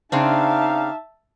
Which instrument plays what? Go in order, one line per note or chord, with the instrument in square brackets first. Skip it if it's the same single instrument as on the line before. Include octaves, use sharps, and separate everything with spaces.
[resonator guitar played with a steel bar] C#3 C4 D4 [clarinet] D#4 [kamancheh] E5 A5 [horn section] F5